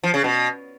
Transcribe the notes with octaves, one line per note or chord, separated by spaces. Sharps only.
F3
C#3
B2